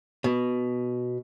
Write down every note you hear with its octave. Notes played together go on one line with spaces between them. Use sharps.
B2